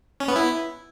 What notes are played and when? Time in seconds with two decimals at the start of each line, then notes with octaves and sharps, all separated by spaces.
0.20 C#4
0.28 B3
0.36 E4